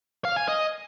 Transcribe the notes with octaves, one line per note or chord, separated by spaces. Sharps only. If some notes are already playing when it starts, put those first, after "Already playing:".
F5
G#5
D#5